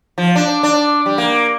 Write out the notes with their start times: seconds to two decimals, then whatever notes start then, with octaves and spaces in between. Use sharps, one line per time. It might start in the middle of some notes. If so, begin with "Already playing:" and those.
0.18 F3
0.35 D4
0.63 D4
1.06 G3
1.18 A#3